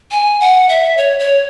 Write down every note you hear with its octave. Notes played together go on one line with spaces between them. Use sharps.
G#5
F#5
E5
C#5
C#5